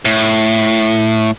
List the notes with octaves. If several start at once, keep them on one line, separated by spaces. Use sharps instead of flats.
A2